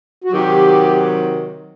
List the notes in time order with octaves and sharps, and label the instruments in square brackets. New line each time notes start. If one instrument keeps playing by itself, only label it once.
[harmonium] F#4
[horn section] C3 D#3 F#3 [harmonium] G4